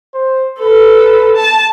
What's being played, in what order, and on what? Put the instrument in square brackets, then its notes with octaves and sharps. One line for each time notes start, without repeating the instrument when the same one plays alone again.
[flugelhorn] C5
[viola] A4 [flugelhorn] B4
[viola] A5